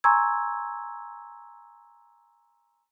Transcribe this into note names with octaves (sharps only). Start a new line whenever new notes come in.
G#5 A#5 C6 C#6 E6 G#6